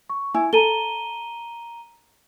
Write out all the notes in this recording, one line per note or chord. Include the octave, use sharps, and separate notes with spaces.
C#6
E4 G#5
A4 A#5 D#7 G7